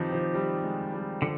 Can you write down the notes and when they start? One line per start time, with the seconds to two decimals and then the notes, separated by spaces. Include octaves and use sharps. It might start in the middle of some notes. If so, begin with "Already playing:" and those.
Already playing: D#3 F3 C4 D#4 G4 B4
0.12 F3
0.34 G3
0.64 G#3
0.93 G3
1.22 D3 F3